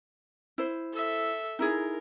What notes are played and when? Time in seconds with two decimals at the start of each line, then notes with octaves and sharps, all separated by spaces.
0.58 E4 C5
0.93 A4 E5
1.59 D#4 E4 G#4 A#4